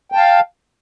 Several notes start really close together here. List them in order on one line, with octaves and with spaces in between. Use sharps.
G5 A5 F5